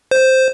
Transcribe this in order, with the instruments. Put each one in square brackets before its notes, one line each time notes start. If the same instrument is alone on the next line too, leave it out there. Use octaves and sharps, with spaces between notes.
[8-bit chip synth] C5